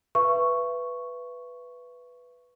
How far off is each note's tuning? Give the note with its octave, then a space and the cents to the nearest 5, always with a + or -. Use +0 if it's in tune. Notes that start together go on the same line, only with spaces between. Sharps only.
B4 +0 E5 +30 C#6 +0